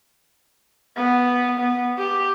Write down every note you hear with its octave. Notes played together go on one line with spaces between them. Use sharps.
B3
B3
G4